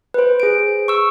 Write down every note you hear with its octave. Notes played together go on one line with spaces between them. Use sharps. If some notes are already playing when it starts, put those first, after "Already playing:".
B4 C5
G#4 D7
C#6 E6